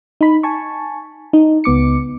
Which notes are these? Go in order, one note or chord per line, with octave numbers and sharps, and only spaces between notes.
D#4 B5
G#5 A5 C#6
D#4
C#2 B3 D6 C#7